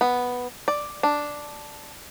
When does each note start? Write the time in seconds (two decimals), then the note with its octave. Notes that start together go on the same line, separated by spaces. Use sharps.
0.01 B3
0.68 D5
1.03 D4